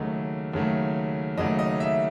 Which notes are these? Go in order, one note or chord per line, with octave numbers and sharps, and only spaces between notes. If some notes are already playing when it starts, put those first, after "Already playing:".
Already playing: D#2 C#3 F#3 A3 D#5
D#2 C#3 F#3 A3
D#2 C#3 F#3 A3 D#5
D#5
E5